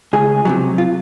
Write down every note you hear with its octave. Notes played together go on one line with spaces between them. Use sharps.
C#2 G#4
C3 D#3 F#3
F4